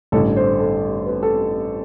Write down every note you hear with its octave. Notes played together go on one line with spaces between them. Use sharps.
A1 G2 D3 A4
C5
A4
B4
A4